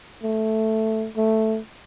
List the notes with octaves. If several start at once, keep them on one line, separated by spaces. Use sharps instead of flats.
A3
A3